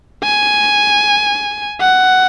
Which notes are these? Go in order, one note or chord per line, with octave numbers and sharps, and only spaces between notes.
G#5
F#5